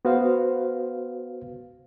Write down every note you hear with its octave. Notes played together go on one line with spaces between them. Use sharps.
B3 F#4 B4 C5 F5